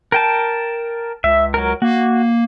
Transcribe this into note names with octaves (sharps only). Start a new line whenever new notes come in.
A#4 G5 A5
C#2 E5
F#3 A#4
A#3 F#4